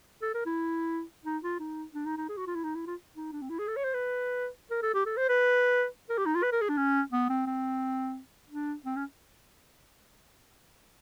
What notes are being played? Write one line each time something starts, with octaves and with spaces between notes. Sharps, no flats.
A4
A#4
E4
D#4
F4
D#4
D4
D#4
D#4
G#4
F#4
F4
E4
D#4
E4
F4
D#4
D4
C4
E4
G#4
A4
C#5
C5
B4
A#4
A4
G4
A4
C5
B4
A#4
G4
D#4
F4
B4
A#4
G#4
D4
C#4
B3
C4
C4
D4
C4
C#4